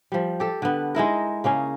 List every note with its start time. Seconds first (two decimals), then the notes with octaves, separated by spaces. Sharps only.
0.12 F3 G3
0.40 G4 A4
0.62 D3 B3
0.95 G#3 D#4 E4 A#4
1.44 C#3 A#3 C#4 G#4